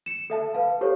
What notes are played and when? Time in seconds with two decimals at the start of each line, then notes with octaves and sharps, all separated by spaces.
0.06 C#7 E7
0.30 A4 E5 A5
0.54 B4 F5
0.81 G4 A4 C5 C#5